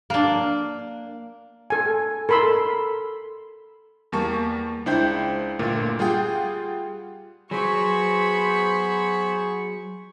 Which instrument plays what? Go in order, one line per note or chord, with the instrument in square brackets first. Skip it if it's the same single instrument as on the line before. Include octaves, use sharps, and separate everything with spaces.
[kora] A#3 D4
[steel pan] A4 G#5
A4 A#4 B5 C6 E6
[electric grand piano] E2 G3 A#3 A5 C#6
C#2 D4 E4 C5 G5 G6
G1 A#2 A3 F4 A#4
G3 F4 G#4 F#5 G5
[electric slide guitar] F#3 [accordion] B3 C5 B5 [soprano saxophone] G#4 [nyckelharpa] C#6